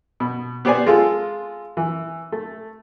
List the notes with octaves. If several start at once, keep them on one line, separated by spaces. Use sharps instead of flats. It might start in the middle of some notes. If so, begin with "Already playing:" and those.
B2
B3 G4 C5 D5 G#5
G#3 F4 A4
E3
A3